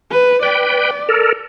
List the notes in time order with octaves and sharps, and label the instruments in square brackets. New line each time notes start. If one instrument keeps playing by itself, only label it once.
[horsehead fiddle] B4
[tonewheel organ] B4 G5 [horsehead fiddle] D5
[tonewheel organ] A4 A#4